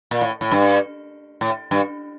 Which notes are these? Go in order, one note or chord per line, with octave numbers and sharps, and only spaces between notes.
A#2
A2
A2
G2
A2
G2